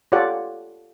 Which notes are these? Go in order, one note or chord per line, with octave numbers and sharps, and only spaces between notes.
F4 G4 A4 C#5 D5 F#5